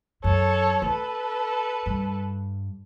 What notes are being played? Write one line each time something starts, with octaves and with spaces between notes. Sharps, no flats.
F#2 A4 C#5
D#4 A4 B4
G2